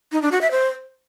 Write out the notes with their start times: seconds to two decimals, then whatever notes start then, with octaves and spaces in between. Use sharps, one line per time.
0.12 D#4
0.22 D4
0.32 F#4
0.41 E5
0.51 C5